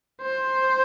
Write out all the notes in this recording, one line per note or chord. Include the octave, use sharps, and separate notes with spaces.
C5